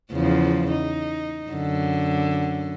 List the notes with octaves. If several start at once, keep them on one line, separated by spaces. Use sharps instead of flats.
E2 C#3 F3
D#4
F#2 D3